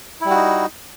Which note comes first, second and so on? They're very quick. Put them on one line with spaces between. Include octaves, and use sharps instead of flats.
E4 G3 F#4 D#4